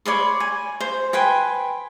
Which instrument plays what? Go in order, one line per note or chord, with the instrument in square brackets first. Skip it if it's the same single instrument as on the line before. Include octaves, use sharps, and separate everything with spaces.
[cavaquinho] C#5 D5 B5 C6
G#5
C5
B4 G5 G#5 C6